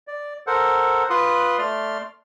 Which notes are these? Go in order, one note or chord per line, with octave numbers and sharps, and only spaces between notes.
D5
A4 A#4 C5 F#5
F4 B4 C6 D#6 F#6
A3 D5 C6 F6